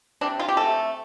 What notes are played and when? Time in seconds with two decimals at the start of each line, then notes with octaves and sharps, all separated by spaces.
0.21 C3 G3 D4
0.39 F4
0.48 G4
0.57 C3 A3 A4